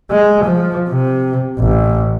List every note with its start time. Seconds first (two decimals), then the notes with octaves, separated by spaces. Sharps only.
0.11 G#3
0.44 F3
0.88 C3
1.59 A1